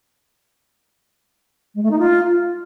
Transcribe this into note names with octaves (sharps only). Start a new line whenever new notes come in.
G#3
A3
D#4
F4